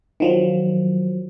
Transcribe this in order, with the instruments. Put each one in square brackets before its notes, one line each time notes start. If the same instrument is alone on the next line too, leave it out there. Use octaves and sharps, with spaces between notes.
[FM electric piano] D#3 F3 F#3